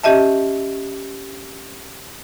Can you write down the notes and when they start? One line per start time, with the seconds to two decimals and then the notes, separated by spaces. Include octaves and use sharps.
0.03 C#4 G4 D#5 E5 A5